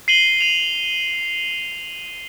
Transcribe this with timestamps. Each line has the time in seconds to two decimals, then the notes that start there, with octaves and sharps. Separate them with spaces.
0.08 C7 D#7 F#7 G7
0.41 D#7 F7